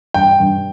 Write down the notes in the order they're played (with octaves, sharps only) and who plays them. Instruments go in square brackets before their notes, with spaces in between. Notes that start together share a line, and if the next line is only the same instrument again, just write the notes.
[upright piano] G2 [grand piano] G5
[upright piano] G2